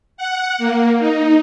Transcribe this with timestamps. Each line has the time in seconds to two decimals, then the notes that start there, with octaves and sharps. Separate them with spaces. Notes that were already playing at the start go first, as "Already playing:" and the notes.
0.17 F#5
0.58 A#3
0.99 D#4